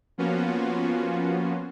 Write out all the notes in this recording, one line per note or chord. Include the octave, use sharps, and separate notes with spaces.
F3 A#3 B3 C#4 F4 F#4